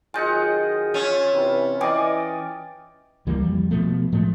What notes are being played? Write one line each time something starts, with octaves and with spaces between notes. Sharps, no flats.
D#3 F#3 F4 G#4 D#5 F#5 G#5 G6
C#4 F4 E5 F5
C3 E3 B4
E3 D5 D#5 F5 G5 G#5 D6
C#2 E3 G3 A#3
F2 G3
B2 F3 A3
A2 F3 G#3 A3